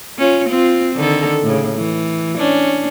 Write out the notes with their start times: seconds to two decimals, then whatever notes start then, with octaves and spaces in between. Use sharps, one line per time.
0.19 C#4 F4
0.49 C4 F4
0.96 D3 D#3 A4
1.43 A2 C#3
1.76 E3
2.37 C#4 D4